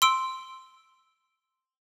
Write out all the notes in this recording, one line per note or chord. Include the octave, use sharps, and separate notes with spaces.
C6 E6 D7